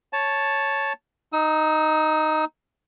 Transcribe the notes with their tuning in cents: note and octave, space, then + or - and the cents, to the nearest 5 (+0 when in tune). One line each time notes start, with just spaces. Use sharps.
C#5 +0 A5 -5
D#4 +0 D#6 +45